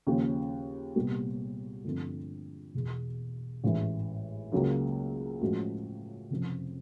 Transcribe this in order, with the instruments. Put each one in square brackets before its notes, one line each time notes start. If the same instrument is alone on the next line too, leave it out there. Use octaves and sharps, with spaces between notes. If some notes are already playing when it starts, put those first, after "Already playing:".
[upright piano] D#2 C#3 F3
C2 A#2 G3 B3
G2 D3 F3 A3 C4
E1 E2 B2
A1 G#2 E3
C#2 C#3 F#3 A#3
A2 F3 G#3 C#4 F#4
F1 F2 C#3 F3